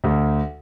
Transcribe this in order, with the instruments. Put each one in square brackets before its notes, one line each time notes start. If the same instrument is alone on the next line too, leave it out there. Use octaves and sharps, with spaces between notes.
[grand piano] D2